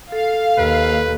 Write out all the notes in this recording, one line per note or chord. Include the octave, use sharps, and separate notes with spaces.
A4 F5
D#2 B4